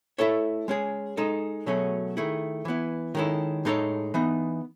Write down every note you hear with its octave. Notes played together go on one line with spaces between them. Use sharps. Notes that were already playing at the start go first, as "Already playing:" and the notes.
A3 E4 A4 C#5 E5
G#3 C#4 G#4
G#3 D#4 A4 D#5
B2 F#3 A3 C#4 G#4
D#3 A3 E4 G#4
E3 B3 E4
D#3 G#3 C#4 E4 A4
A2 G#3 D#4 A4 C#5
E3 B3 D#4